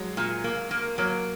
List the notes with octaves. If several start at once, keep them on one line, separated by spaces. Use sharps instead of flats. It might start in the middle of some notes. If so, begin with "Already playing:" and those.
Already playing: F#3 G#3
A#2
A#3
A#3
F#3 A#3